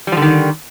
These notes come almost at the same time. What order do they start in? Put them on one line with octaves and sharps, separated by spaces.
G3 F3 D3 D#3